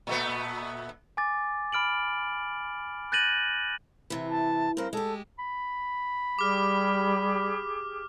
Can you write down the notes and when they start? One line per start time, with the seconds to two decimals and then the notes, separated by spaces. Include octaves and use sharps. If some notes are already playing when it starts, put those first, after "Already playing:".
0.07 A#2 A3 B3
1.17 G#5 D6 A6
1.72 B5 F6 D7 F#7
3.12 F#6 G6 A6 A#6 D#7 F#7
4.10 C3 E3
4.30 A5
4.77 G2 C4 A#4
4.93 G#3 G4 A4
5.39 B5
6.39 G3 G4 G#4 D6 F6